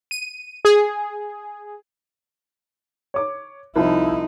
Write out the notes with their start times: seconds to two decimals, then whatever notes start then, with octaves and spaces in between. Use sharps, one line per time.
0.11 D#7
0.65 G#4
3.14 C#5 D6
3.76 C2 F3 D#4 E4